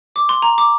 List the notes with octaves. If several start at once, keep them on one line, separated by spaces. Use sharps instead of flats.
D6
C6
A#5
D6